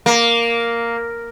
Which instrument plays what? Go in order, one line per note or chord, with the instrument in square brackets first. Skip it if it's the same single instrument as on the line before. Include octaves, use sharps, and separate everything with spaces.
[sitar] A#3